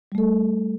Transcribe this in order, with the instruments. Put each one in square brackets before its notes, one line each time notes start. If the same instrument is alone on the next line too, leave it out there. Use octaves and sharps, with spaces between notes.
[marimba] G3
A3
A4